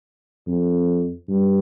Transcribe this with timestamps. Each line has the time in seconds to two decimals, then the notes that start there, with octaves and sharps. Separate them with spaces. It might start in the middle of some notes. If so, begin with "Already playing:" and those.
0.47 F2
1.29 G2